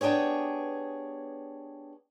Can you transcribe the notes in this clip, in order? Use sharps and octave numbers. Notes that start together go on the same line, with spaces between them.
B3 D4 G4 G#4 C#5